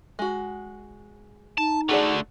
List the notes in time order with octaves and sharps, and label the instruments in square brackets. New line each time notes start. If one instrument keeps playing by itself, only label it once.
[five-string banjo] G#3 F#4
[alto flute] D#4 [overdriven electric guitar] A5
[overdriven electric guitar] D3 A3 [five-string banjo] F#4 G#4 D5